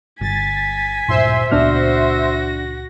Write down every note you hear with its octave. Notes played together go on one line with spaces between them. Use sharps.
G1 G#5 A6 B6
D1 G2 A#2 C5 E5 C6
C#2 A#2 B3 D4 F#4 F6 A#6